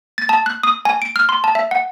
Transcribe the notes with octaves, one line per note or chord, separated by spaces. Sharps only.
A6
A5
F#6
D#6
G#5
D7
F6
C6
A5
E5
F#5